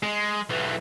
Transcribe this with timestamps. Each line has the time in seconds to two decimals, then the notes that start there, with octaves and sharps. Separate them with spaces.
0.03 G#3
0.49 B1 E3